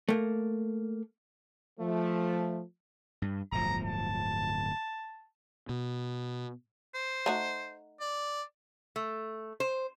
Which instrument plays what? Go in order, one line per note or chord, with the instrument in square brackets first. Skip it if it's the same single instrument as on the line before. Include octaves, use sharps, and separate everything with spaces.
[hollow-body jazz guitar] A3 A#3
[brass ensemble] F3 A3
[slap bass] G2
[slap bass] D1 G1 F3 [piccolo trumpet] A#5
[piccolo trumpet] A5
[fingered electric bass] B2
[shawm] C5
[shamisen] A3 D#4 F#4
[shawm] D5
[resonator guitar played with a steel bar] A3
C5